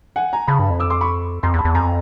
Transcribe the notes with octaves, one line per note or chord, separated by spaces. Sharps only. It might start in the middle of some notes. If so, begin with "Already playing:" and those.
F#5 G#5
G#5 A#5
C#3 A5 B5
G2
F2
D6 E6
C6 D6
B5 C#6
F2 A#5 C6
E2
A5 B5
E2
F2 G#5 A#5